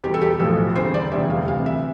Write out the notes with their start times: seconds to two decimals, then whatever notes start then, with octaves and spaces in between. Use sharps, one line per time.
0.04 E2 B2 G3 G4
0.14 A4
0.21 G4
0.40 B1 A2 F3 A4
0.76 E2 D3 G3 C5
0.94 D5
1.12 F1 E2 D3 G3 E5
1.30 F5
1.48 D2 C3 E3 G3 F5
1.66 E5